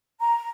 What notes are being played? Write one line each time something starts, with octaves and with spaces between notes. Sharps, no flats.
A#5